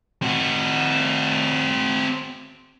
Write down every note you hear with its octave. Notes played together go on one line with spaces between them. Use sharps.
C4 F#4